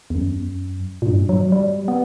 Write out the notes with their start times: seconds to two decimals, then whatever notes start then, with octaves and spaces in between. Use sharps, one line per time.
0.10 E2
0.15 F#2
1.02 A#2
1.07 G2
1.29 F#3
1.52 G3
1.88 B3